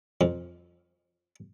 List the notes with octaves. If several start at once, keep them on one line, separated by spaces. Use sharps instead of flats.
F2